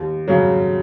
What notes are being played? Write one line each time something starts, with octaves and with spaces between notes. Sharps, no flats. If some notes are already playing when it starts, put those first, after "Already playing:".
Already playing: D#2
C#3 F#3